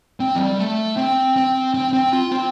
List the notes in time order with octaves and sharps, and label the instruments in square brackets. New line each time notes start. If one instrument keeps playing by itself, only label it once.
[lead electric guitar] C4
F3
G3
A3
C4
C4
C4
C4
F4
C4